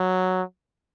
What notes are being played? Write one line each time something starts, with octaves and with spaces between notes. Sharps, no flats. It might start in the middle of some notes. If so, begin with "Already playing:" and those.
Already playing: F#3